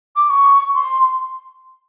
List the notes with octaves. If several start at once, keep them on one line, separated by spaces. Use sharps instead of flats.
D6
C#6
C6